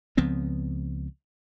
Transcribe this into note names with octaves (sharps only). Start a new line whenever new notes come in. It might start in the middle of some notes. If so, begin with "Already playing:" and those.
C#2 F3 B3 C4